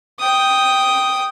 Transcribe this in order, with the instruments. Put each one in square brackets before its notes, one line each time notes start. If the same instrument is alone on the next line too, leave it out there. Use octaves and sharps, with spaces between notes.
[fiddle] G5 D#6